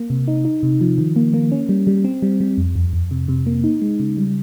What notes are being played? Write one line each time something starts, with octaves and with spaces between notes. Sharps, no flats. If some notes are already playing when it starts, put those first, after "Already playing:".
Already playing: A#3
C3
D#4
D#4
C3
F3
D#3
A#3
A#3
C#4
G3
G3
C4
G3
G3
F2
F2
F2
C3
C3
A#3
D#4
G#3
C#3
G3